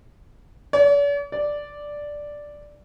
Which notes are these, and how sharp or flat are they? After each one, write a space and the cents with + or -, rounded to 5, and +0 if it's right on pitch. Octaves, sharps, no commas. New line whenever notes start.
D5 -45
D5 +0